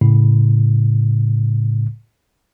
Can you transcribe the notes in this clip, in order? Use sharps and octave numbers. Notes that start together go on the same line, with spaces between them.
A2 C#3